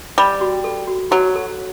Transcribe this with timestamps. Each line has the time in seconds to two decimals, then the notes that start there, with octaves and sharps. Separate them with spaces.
0.18 G3 B5
0.41 F#4
0.64 A4
0.88 F#4
1.11 F#3 F#4
1.36 A4